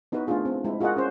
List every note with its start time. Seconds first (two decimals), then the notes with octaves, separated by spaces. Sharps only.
0.12 B3 D#4 E4 F#4 B4
0.27 A3 D4 E4 F4 G#4
0.45 C4
0.64 G#3 E4
0.81 F4 F#4 G#4 A#4 D#5 F#5
0.96 C#4 G#4 C5